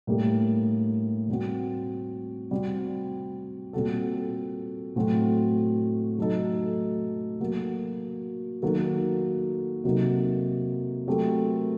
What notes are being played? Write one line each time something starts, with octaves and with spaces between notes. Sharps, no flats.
A2 G3 A#3 D4 G4
G3 C4 F#4
G3 C4 F#4
A#2 G3 C4 F#4 A4
A2 F#3 A3 C4 F#4
F#3 A3 D#4 A4
F#3 A#3 F#4
D#3 F#3 A#3 F#4 A4
C3 F#3 A#3 D#4 A4
F#3 A3 C4 G4 A#4